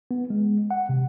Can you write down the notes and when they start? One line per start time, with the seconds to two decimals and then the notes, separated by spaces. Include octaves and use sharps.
0.11 B3
0.30 G#3
0.71 F#5
0.89 C3